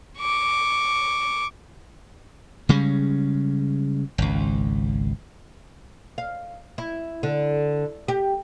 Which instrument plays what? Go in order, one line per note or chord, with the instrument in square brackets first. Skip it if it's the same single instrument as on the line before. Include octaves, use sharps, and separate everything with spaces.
[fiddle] C#6 D6
[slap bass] C#3 G3 G#3 C#4
G#1 C#2
[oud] F5
E4
D3
G4